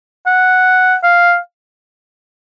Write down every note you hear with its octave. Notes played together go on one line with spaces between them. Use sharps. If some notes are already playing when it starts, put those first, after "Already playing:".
F#5
F5